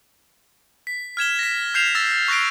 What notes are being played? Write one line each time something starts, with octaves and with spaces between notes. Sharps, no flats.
B6
F6 G#6 E7 G7
A#6 B6
F6 G6 C7 E7 F7
E6 A6 B6
C#6 F#6 A#6 C7 D7